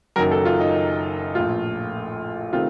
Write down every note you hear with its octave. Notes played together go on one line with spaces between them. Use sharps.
F#1 F#2 D#3 F#3 A#4
A4
F4
D#4
A#1 A2 A3 F4
C3 D#3 A3 C4 F4